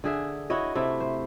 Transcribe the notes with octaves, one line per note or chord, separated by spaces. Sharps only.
D3 G#4 E5
E4 F#4 C#5 D#5
C3 A3 E4
C5